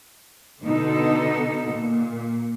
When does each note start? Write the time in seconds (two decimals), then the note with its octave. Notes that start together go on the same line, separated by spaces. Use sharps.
0.64 B2 D3 B3 D#4 A4
1.74 A#2